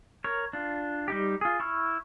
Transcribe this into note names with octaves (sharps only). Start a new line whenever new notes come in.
A#4 C#5
D4 F4
G3 D#4 G4
F4 G#4
E4 C#6 F6